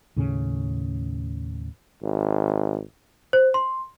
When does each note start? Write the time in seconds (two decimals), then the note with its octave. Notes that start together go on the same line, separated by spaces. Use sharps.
0.16 D#2 A2 C#3 C#4
2.03 G#1
3.33 C5
3.54 C6